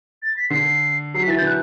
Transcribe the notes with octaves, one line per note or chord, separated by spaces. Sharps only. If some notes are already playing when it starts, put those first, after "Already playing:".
A6
B6
D3 C7
F#3 C7
B6
E3 A6
G6
D3
F#6